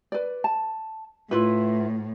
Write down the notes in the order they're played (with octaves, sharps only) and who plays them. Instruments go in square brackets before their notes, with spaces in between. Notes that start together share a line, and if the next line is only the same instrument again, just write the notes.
[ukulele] B4 D5
A5
[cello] A2 [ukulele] E4 F4 B4